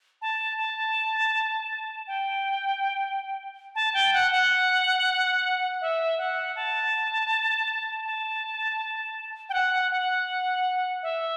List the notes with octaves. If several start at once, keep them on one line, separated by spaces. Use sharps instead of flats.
A5
A5
G5
A5
G5
F#5
F#5
E5
F#5
A5
A5
G5
F#5
F#5
E5